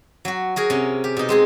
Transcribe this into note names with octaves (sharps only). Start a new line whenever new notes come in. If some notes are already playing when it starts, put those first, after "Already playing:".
F#3 F#4
F#4 G#4 A#4
C3 C#4
G4
B2 D#4
G#3 C4 G#4